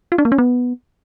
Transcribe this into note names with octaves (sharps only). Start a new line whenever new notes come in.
F4
D4
A#3
C#4
B3